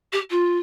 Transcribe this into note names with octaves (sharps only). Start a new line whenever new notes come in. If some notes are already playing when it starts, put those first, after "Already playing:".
G4
F4